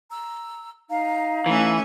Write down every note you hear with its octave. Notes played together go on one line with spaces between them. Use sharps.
A#5 E6
D#4 F5 A#5
E3 A3 C#4 E5